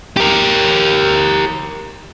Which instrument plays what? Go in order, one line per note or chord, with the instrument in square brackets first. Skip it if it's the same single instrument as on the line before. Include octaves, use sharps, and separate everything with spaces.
[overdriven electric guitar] G4 A#4